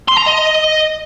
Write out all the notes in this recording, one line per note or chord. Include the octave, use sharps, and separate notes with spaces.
C6
A#5
D#5